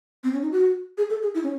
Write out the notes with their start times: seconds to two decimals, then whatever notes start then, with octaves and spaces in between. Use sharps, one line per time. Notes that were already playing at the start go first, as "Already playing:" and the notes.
0.24 C4
0.33 C#4
0.42 D#4
0.52 F#4
0.98 G#4
1.10 A4
1.23 G#4
1.34 E4
1.44 C#4